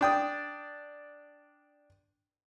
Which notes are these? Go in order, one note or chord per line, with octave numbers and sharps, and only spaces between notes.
D4 G5 D#6